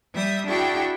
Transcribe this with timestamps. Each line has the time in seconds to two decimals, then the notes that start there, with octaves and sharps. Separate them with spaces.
0.13 G3 E5 D#6
0.46 D4 E4 F#4 G#4 G5 C#6